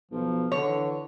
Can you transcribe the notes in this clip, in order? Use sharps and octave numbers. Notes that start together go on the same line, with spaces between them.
B1 F3
D3 C#5
E3